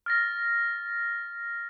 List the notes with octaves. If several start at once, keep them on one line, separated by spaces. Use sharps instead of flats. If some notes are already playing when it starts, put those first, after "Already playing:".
F6 A6 A#6